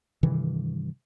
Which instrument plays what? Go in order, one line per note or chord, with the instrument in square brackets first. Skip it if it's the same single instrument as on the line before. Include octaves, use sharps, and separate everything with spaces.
[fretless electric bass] G2 C3 D#3 E3